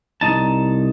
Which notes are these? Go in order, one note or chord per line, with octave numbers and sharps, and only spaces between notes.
C2 D#4 A5